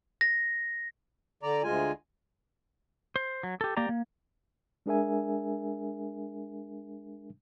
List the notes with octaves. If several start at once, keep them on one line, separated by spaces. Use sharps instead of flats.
A#6
D3 D5 A#5
D2 G#3 F4 G#5
C5
F#3
G4 A4
A#3 G4 D5 A#5
A#3
G#3 D4 G#4 A#4 E5 G#5